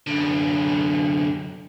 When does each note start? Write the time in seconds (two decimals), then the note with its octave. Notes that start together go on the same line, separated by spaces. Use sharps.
0.07 F#2 D3